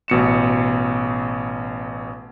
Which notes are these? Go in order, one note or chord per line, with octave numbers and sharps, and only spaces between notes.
A1 B2 C#7 E7